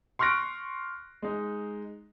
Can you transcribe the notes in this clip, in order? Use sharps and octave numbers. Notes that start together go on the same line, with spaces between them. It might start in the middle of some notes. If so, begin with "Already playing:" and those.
C6 C#6 F6 F#6 A#6 D7
G#3 D#4